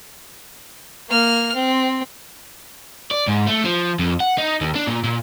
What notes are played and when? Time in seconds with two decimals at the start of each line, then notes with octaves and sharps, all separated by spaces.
1.10 A#3 F6
1.55 C4
3.11 D5
3.27 G#2
3.47 A3
3.65 F3
3.99 F2
4.20 F#5
4.38 D#4
4.61 D#2
4.75 D4
4.88 A#2
5.04 A#2